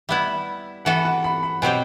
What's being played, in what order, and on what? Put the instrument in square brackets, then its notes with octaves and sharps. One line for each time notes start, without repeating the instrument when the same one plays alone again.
[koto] G3 B3 E4 [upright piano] E5
[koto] E3 B3 F#4 A4 [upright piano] F#5
[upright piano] F#5
B5
B5
[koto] B2 F#3 C4 G4 [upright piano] G5